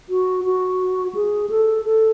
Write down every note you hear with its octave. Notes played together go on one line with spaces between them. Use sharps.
F#4
F#4
G#4
A4
A4